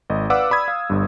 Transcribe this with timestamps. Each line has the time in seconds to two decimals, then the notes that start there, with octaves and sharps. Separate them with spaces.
0.10 G#1 D#5
0.30 B4 D5 F5 F#5 D6 E6
0.51 D5 B5 D#6 G#6
0.68 F5
0.90 G1 G2